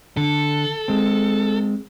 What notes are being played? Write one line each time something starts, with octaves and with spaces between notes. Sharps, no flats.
D3 A4
G#3 C4